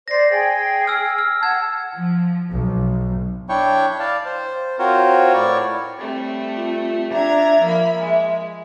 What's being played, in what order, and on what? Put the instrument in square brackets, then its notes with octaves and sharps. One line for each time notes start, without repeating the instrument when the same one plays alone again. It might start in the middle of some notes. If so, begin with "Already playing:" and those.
[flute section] C5 D5 [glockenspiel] A#6 C7
[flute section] G#4 G5
[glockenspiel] E6 F6
F6
[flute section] F#5 A5 [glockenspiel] F6 G#6
[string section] F3
B1
[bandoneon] D4 E4 C#5 G5 C#6
D5 F5 A5
C5
C4 F4 F#4 A#4 C5 C#5
A2 E4 C#5 D5 C#6
[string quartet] G3 A3 C4
[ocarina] F4
[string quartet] D4 A#5 G#6 [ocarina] E5
[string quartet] F3 A#3 B5
G#3